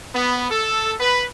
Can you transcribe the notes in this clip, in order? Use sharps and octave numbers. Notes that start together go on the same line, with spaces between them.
B3
A4
B4